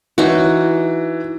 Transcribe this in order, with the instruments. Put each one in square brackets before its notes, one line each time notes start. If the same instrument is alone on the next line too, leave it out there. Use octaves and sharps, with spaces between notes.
[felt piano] E3 [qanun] D#4 F#4